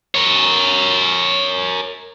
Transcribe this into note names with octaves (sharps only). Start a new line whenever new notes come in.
A#4 C#5